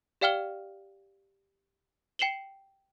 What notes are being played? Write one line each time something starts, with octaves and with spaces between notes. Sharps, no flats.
G4 D5 F5 G5 F6 G7
G5 C7 E7 F#7 G7